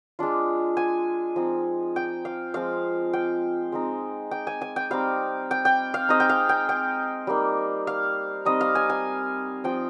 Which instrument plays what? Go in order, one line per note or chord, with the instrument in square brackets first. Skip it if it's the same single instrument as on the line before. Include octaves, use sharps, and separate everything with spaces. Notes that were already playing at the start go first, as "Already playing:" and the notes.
[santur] G#3 D4 F4
G#5
F3 C4 D#4
G5
F5
F3 G#3 C4 F5
G5
G#3 C4 D#4
G5
G#5
G#5
G5
G3 C4 D#4 F5
G5
G5
F5
G#3 C4 D#4 D#5
G5
F5
G5
G5
G3 A#3 D#4
F5
G3 C4 D#4 D#5
F5
G#5
G#5
F3 C4 F4 G5